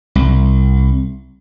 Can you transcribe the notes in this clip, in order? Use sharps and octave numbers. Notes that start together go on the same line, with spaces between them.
C2